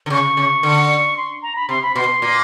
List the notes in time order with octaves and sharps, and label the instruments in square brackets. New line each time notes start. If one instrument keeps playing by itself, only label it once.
[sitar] D3
[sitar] C#3 [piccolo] C#6
[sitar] C#3
D3
[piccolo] C6
A#5
B5
[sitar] C3 [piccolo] C6
[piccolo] B5
[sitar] B2 [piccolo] C6
[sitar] A#2